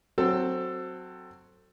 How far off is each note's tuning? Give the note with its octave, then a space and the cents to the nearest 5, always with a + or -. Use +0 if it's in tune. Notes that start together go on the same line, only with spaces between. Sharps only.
F#3 +0 C4 +0 A4 +15